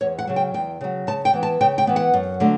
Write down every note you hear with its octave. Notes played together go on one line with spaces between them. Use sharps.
E2 C#5
F#5
C#3 F#3
G5
E2 G5
C#3 F#3
C#3 A5
G5
E3 B3
A5
C#3 G5
G5
E3 B3
F#5
F#2
D3 F#3 A3